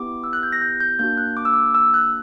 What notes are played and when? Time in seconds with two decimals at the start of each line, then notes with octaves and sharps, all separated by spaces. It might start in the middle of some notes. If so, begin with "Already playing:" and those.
Already playing: B3 E4 G4 D6
0.24 E6
0.33 F#6
0.43 G6
0.52 A#6
0.62 G6
0.80 G6
0.99 A#3 D4 F#4 G6
1.18 F#6
1.37 D6
1.45 E6
1.54 D6
1.75 E6
1.94 F#6